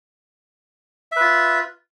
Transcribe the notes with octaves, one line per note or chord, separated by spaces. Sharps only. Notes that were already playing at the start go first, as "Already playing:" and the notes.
F4 B4 E5